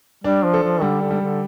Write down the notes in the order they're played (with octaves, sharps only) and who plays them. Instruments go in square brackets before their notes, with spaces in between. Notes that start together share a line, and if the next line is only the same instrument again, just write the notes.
[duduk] G3 [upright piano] D4
[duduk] F3
[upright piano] A4
[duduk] F3
[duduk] D3 [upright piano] G3
[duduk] D3
[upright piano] G3
[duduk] D3